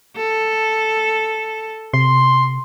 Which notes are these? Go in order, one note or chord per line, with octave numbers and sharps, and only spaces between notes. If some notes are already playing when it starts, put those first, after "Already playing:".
A4
C3 C6